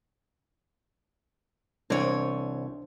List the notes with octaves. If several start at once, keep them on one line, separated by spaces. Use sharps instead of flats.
C2 E3 D4 C5 C#5